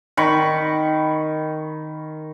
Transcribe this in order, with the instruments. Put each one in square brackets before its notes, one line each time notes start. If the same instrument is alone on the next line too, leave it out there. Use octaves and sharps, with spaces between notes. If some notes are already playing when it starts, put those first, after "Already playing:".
[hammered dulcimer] D#3 B5 C#6